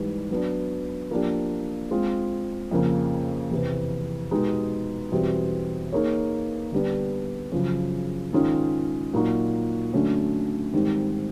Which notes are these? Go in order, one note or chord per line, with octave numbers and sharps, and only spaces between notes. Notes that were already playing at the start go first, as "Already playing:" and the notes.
Already playing: G#2 E3 G3
F#3 B3 D4
F3 A#3 D4 G4
G#3 C4 F4
F2 C#3 F3 A#3
E2 C3 E3
B2 G#3 B3 D#4 G4
E2 B2 G3 C4
A#3 D#4 G#4 C#5
D3 G3 B3 D4
F#2 C#3 F3
G#2 D#3 G#3 C#4 F4
A#2 F#3 A#3 D#4 F#4
D3 F#3 A3 C#4
G#2 D#3 G3 C4